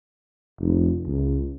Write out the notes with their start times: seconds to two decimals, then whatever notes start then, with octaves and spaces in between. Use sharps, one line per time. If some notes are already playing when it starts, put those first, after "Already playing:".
0.60 F1
1.06 C#2